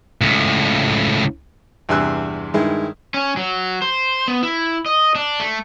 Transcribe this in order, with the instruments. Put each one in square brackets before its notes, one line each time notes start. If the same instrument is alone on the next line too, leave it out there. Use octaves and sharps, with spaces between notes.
[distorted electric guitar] C#2 A2
[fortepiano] E2 G2 C3 G#5 E6 F#6
G2 D#3 G#3 E4
[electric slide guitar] C#4
F#3
C5
B3
E4
D#5
D4
A3